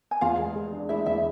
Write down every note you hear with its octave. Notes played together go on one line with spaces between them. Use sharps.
G#5
E2 F4 F5
G#3
G#3
D4
G#3 E4 E5
E2 E4 E5